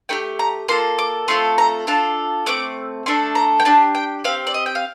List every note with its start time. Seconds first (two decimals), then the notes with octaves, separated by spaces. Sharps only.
0.09 A3 D#4 G4 G5
0.39 A#5
0.69 A#3 F4 A4 C6
0.99 D6
1.28 A3 C4 F4 A4 C6
1.58 A#5
1.87 D4 F4 A4 A5
2.46 A3 C4 D6
3.06 A3 D4 A4 C6
3.35 A#5
3.60 G5
3.65 D4 G4 A5
3.95 G5
4.24 C4 G4 F5
4.47 D5
4.54 D#5
4.66 G5
4.75 F5